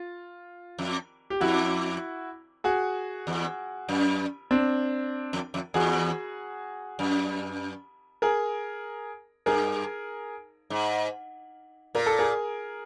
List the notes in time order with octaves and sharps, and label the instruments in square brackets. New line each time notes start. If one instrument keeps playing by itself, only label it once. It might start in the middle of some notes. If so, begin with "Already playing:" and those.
Already playing: [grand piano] F4
[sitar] F2
[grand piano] G4
[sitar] F2 [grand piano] E4 F#4
[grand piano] F#4 G#4
[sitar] E2
F#2
[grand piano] C4 D4
[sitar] F2
F2
[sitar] E2 [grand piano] F#4 G#4
[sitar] F#2
[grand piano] G#4 A#4
[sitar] G2 [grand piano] G#4 A#4
[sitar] G#2
[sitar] A#2 [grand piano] A#4
[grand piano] A4
G#4 A#4